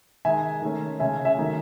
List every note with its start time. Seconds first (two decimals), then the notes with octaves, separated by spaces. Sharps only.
0.25 D#3 G#3 D#4 E5 G#5
0.62 D#3 A3 C#4
1.00 C#3 G#3 C#4 E5 G#5
1.25 E5 G#5
1.38 D#3 F#3 A3 D#4